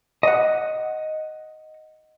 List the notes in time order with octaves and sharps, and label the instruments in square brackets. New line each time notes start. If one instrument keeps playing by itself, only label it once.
[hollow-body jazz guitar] D#5 F#5